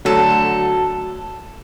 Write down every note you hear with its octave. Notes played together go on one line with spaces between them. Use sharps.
D3 F#3 A3 A4